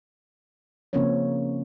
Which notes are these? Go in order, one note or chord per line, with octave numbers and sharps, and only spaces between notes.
C#3 F3 A#3 C4 C#4 C#5